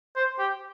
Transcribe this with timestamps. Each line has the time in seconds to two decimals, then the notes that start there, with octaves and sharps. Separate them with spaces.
0.16 C5
0.39 G4